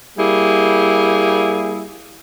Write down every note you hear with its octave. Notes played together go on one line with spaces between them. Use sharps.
G3 A#3 E4 G#4